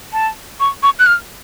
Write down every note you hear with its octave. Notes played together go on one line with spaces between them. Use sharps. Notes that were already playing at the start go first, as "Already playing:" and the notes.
A5
C#6
C#6
F#6
F6